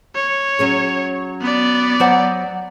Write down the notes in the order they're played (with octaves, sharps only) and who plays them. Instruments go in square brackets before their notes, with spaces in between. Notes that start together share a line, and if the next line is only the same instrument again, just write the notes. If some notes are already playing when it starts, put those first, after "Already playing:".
[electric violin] C#5
[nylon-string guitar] F#3 C#4 G#4
[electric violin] B3 D5
[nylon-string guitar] F#3 C5 F#5